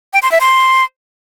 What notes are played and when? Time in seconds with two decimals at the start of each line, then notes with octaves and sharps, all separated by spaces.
0.13 G5
0.22 C6
0.32 E5
0.41 C6